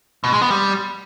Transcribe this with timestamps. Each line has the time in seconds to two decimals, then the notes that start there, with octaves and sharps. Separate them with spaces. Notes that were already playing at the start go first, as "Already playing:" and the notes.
0.24 B2
0.33 G#3
0.42 B3
0.50 G3